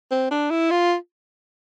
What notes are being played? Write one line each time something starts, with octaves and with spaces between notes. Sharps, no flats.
C4
D4
E4
F4